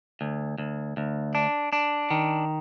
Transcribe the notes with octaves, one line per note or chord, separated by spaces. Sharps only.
D2
D2
D2
D4
D4
D#3